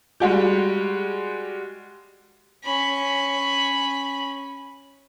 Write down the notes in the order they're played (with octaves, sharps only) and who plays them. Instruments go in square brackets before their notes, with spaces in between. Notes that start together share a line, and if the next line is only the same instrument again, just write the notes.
[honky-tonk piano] G3 G#3 F#4 G4
[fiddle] C#4 B5